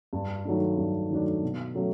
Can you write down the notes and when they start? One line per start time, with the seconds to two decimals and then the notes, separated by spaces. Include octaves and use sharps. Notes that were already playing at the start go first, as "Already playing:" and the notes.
0.13 G2
0.45 D#3 F#3 A3 D4
0.78 G2
1.10 D#3 F#3 A3 D4
1.43 B2
1.75 F#3 A3 C#4